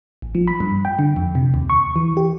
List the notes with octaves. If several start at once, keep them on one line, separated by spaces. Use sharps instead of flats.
A1
F3
B5
G2
G5
D3
F2
C3
D#2
C#6
E3
G4